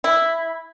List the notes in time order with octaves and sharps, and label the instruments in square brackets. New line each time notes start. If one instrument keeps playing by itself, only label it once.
[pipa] E4